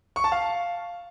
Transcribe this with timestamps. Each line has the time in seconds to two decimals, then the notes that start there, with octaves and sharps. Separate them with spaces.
0.16 C#6
0.24 A5
0.32 F5